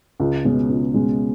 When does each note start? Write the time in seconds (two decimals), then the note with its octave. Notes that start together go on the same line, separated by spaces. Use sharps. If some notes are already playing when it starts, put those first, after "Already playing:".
0.20 C#2
0.45 B2 G#3 C#4
0.69 C#2
0.94 B2 G#3 C#4